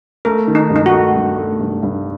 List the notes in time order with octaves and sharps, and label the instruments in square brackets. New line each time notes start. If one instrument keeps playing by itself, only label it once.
[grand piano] A3 [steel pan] A#4
[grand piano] D#3
[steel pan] D#4
[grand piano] G2
[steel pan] D#4
F#4
[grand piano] A3
G2
A3
G2
G2